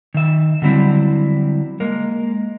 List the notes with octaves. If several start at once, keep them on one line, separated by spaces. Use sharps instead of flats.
D#3 E5
D3 F#3 G3 C4 E4
G#3 A#3 A#4